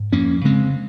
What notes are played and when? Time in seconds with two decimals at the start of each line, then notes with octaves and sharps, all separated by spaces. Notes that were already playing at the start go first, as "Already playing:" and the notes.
Already playing: G#2
0.12 F2 A#3 C#4
0.45 C#3 G#3 C4